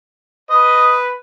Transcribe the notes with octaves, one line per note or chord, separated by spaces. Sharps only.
B4 D#5